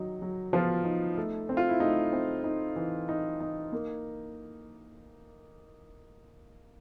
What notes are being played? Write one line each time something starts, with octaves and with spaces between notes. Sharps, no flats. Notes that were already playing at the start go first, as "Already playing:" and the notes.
Already playing: D#3 F#3 D#4
F#3
F3 B3 F4
D#4
A3
C4
F4
E4
A3 D#4
C4
D#4
E3
D#4
D#4
A#3